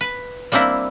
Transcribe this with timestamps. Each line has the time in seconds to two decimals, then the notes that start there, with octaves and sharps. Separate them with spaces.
0.01 B4
0.52 G3 A#3 C4 D4 E4